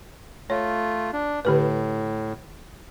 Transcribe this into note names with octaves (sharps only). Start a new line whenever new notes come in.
A3 F4 C#5
D4
A2 D3 G4 B4